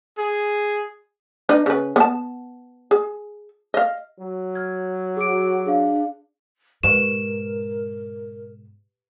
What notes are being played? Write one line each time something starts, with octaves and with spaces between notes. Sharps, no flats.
G#4
D4 D#4 B4
C#3 B4
B3 A5
G#4
D#5 F5
F#3
F6 G#6
F#4 G#4 D6 D7
D4 G#4 F5
G#2 B2 G4 A#4 B4 E7